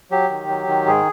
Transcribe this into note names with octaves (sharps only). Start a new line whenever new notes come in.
F#3 G4
D#3
F#3
D#3
G#2 G#4